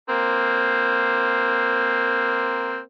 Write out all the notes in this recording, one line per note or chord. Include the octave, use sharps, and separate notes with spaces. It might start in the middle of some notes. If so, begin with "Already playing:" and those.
A#3 C4